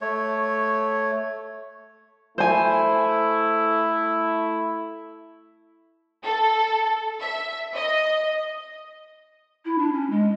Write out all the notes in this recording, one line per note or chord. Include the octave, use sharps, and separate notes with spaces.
A3 C#5
A3 E4 C5 G#5
A4
E5
D#5
E4
D4
C#4
G#3